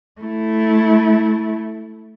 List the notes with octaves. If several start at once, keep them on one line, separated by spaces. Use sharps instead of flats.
A3 E4